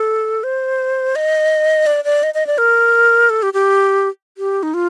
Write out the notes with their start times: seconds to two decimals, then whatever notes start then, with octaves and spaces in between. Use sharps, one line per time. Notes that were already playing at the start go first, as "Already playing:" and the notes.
Already playing: A4
0.43 C5
1.15 D#5
1.86 D5
2.04 D5
2.23 D#5
2.34 D#5
2.47 D5
2.58 A#4
3.30 A4
3.42 G4
3.54 G4
4.37 G4
4.63 D#4
4.74 F4